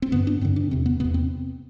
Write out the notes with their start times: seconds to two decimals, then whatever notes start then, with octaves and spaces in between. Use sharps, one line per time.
0.02 C4
0.12 G2 D3 B3
0.27 D4
0.41 G2 D3 C4
0.56 D4
0.70 E2 C3 C4
0.86 B3
1.00 E2 C3 B3
1.14 C4